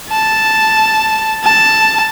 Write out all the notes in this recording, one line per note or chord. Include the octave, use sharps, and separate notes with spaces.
A5
A5